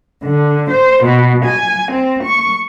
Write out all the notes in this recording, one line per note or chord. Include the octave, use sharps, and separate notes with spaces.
D3
C5
B2
G#5
C4
C#6